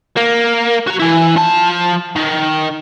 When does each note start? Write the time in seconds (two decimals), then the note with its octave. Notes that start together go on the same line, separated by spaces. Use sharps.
0.17 A#3
0.87 F#4 A#5
1.00 E3 E4
1.36 F3 A5
2.16 D#3